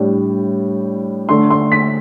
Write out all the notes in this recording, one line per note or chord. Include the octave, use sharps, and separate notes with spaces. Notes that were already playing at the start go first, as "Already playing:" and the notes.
Already playing: A2 G3 D4
D3 A3 D4 C6
C6
B6